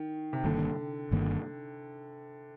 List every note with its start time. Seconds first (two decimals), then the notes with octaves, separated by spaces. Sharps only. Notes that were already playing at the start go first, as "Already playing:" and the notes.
Already playing: D#3
0.33 C3
0.44 G1 G2 D3 D#3 A#3
1.11 G1 G2 D#3 A#3